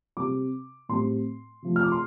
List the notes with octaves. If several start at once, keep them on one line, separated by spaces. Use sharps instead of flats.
C3 G3 C4 D6
A2 G3 C4 C6
C3 F3 A3
F6
D6
C6